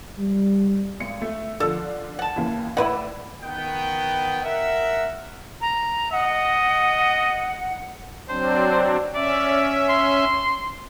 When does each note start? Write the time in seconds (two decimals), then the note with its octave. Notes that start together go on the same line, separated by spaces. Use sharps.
0.19 G3
1.00 G#1 C#7
1.22 A3
1.60 D3 F3 A4
2.19 F#5 A5
2.36 D#2 C#3 E3
2.77 A2 E4 B4 D5 F#5 E7
3.41 D#3 B3 G5
4.43 A#4 E5 F#5
5.61 A#5
6.12 D#5 F#5
8.29 F#3 C4 D4 C5
9.15 C#4 D5 E5
9.89 C6